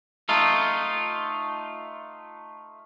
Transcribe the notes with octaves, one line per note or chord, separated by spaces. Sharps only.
A3 D#4 F4